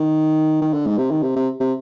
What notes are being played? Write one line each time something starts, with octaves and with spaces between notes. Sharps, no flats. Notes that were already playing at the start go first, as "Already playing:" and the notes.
Already playing: D#3
D#3
D3
G#2
C3
D#3
C3
C3
C3